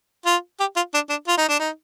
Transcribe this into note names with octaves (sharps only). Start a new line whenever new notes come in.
F4
G4
F4
D4
D4
F4
D#4
D4
D#4